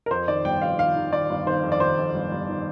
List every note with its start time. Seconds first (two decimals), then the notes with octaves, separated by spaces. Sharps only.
0.06 A#4
0.11 F2 C5
0.28 D#3 D5
0.45 G1 G5
0.62 F2 F5
0.79 D#3 F5
0.96 D#3
1.12 D#3 D5
1.30 G1
1.46 D#3 C5
1.63 F2
1.72 D5
1.80 D#3 C5
1.97 F2
2.14 G1
2.32 G1
2.49 D#3